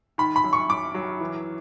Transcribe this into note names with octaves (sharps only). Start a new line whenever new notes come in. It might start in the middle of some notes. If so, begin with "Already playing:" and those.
D#3 B5
B5
F#2
C#6
F#2 D6
F#3
E3